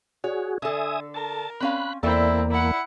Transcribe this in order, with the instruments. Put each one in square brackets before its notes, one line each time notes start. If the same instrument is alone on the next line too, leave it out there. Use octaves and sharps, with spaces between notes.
[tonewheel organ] F#4 G#4 [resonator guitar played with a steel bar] C#5
[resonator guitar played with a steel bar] D3 A4 [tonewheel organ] E5 G#5 D#6
[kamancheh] A#4 [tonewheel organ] A5
[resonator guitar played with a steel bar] C4 C#4 F5 [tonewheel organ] B5 F#6
[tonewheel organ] E2 A#3 [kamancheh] C4 E4 [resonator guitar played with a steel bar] A4 D5 E5
[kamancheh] E4 F#5